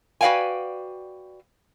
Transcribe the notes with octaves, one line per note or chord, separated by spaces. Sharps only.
F#4 B4 D5 F5 G5 G#5